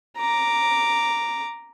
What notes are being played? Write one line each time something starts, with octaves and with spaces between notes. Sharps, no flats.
A#5 D6